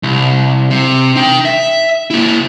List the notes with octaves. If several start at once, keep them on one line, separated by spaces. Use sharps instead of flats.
C2
C3
D#4 G5
E5
A#3 E4